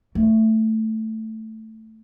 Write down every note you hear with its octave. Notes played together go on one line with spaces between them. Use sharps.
A3